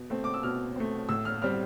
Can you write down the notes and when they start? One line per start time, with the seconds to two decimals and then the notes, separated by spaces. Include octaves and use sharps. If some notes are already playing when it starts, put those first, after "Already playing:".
Already playing: B2
0.10 A3 C4
0.24 D6
0.34 E6
0.43 B2 F6
0.76 A3 C4
1.09 A2 E6
1.25 F6
1.42 G3 C4 F6